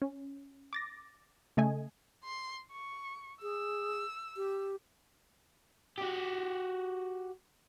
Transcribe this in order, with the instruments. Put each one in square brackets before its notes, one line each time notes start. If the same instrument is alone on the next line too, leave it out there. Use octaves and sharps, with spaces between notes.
[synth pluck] C#4
D6 A6 A#6
C#3 A3 D#5 G#5
[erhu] C6
C#6
[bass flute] G#4 [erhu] E6
[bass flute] G4
[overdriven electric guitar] F#4 G4